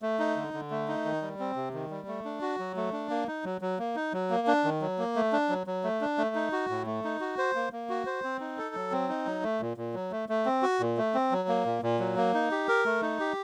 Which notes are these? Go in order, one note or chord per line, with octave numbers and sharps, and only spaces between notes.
A3
D#4
D3
D3
A3
D#4
D#3
G3
C4
C3
D#3
G3
A3
D4
F#4
F#3
A3
D4
A#3
D#4
F#3
F#3
A#3
D#4
F#3
A#3
D4
D#3
F#3
A#3
A3
D4
F#3
F#3
A3
D4
A3
D#4
F#4
A2
A3
D#4
F#4
C5
A#3
A#3
F#4
C5
C4
D#4
A4
F#3
C4
D#4
F#3
A3
A#2
A#2
F#3
A3
A3
C4
F#4
A#2
A3
C4
F#3
A#3
A#2
A#2
F#3
A#3
D#4
G4
A#4
A3
D#4
G4